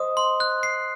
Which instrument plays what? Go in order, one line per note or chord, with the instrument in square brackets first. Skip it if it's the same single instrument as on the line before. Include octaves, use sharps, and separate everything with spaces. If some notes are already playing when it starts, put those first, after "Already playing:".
Already playing: [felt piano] C5 D#5 [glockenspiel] D#6
[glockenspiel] C6
F#6
C7